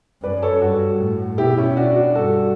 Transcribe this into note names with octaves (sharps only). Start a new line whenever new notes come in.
F#2 B4 D5
A4 C#5
G2 F#4 A4
A2
B2 E4 G4
C#4 E4
D4 F#4
D4 F#4
G2 F#4 A4